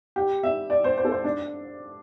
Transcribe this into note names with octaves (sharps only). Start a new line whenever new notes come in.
G4
E5
D5
C5
C5
A4
C5
D4